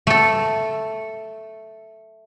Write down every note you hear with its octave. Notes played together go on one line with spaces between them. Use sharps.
A3 A4